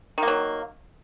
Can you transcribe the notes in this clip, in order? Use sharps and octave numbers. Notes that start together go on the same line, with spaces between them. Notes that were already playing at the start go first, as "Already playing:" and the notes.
D#3 F#3 A#3